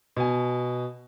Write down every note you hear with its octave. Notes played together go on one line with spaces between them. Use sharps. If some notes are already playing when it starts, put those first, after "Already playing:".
B2 G#5